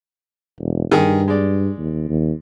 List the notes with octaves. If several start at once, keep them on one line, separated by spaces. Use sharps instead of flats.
E1
G2 D#3 G#4
G#3 D5
D#2
D#2